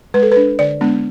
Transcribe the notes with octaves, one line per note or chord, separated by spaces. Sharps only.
G#3 B4
A4
B4
D4
D3 D5
G#3 B3 D4